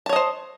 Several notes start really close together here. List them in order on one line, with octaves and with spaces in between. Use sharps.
A5 C#5 D#5 C5